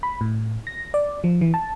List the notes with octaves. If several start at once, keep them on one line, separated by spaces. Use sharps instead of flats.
B5
A2
A#6
D5
F3
E3
A5